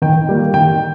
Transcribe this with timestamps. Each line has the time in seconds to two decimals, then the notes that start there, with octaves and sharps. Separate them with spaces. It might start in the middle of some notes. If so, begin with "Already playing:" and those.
0.02 D#3 G5
0.29 G3 A#3
0.54 D#3 G5